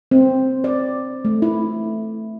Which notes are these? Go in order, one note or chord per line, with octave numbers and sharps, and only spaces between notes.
C4
D5
A3
E4